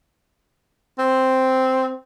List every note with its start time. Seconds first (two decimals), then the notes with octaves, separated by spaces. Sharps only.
0.99 C4